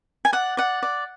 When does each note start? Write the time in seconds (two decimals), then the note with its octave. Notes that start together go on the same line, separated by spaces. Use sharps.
0.25 G#5
0.33 D5 F#5
0.57 D5 F#5
0.83 D5